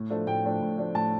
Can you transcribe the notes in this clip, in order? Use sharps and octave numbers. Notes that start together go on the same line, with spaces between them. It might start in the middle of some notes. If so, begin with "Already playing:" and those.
Already playing: A2
F3 A3 D4
A2 G5
F3 A3 D4
A2
F3 A3 D4
A2 A5